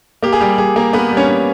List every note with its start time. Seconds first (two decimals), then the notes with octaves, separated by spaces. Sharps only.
0.23 A#3 G4
0.33 G#4
0.41 G3 G4
0.58 G3 G#4
0.76 A#3 A#4
0.93 A#3 B3 B4
1.11 G3
1.17 C#4 C#5
1.29 C#4